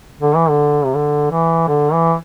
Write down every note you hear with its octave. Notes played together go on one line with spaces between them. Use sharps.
D3
E3
D3
C3
D3
E3
D3
E3